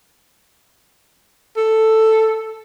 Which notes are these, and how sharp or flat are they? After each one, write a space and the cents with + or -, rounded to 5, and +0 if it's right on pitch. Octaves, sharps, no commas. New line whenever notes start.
A4 +5